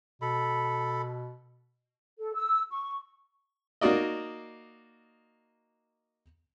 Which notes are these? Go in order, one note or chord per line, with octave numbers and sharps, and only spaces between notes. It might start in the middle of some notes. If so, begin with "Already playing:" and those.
B2 A4 B5
A4
E6
C#6
A#3 D#4 F#4 D5 D#5